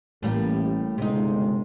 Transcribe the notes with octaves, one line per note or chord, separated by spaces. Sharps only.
A1 A2 G3 A#3
G1 C#2 C3 G#3 D#4